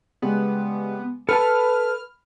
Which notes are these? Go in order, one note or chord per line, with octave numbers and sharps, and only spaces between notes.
C#3 G3 G#3 B3
A4 B4 A5 B5 F6